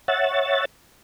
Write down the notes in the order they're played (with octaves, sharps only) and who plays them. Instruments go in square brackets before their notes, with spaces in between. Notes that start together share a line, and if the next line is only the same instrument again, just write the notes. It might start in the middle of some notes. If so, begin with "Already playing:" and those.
[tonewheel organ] C#5 E5 F#5 A6